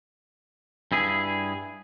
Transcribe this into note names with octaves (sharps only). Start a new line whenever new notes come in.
G2 E4 G#4